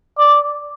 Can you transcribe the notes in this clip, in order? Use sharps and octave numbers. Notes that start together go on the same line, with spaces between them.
D5